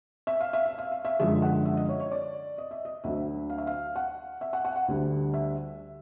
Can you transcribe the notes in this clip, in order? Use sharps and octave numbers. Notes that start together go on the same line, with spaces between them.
E5
F5
E5
F5
E5
F5
E5
F#2 D3 F3 G#3 E5
F#5
E5
D#5
C#5
C#5
D5
D#5
E5
D#5
D2 D3 F#3 E5
F5
E5
F5
F#5
E5
F#5
F#5
F#5
D2 D3 G3
E5